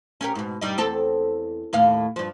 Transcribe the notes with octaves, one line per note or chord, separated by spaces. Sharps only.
C#4 G4 A#4
G#2 B2
G2 G3 D#4
E2 C4 A4
D#2 A2 F5
G2 F3